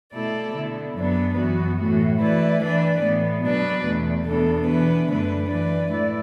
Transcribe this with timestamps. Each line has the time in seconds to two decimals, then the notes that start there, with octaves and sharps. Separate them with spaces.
0.14 B2 A3 E4 A4 D5
0.55 D3 B3 E4
0.96 F#2 F#3 B3 D4 B4
1.37 F#2 E3 B3 F#4
1.79 A2 E3 A3 F#4
2.20 E3 A3 E4 B4 D5
2.62 E3 D4 B4 D5
3.02 A2 E3 B3
3.43 B2 F#3 D4 B4 D5
3.85 E2 B2 A3
4.25 E2 B2 B3 D4 A4
4.67 E3 B3 D4 B4
5.09 F#2 D3 A3 D4 B4
5.49 E3 D4 B4 D5
5.91 A2 A3 E4 D5